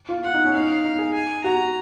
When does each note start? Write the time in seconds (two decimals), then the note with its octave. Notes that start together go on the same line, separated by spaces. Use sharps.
0.09 F4
0.23 F4 F#5
0.34 D#4
0.45 C#4
0.54 D#4 F5
0.84 D#4
0.98 G#4
1.14 G#5
1.44 F#4 A#5